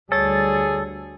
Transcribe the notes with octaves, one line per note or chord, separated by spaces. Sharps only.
D2 G3 G#4 A4 C#5 A6